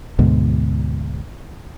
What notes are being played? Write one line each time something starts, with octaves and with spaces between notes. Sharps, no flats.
D2 G#2 B2